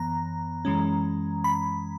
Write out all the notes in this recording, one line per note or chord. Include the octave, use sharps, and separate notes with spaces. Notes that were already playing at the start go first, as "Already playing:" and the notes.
Already playing: F#2 E3 B3 A#5
F#2 E3 G#3 C#4
B5